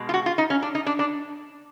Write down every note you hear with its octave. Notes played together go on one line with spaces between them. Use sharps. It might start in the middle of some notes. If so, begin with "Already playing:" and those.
Already playing: B2 G#3
F4
F#4
F4
D#4
C#4
D4
D#4
D4
D4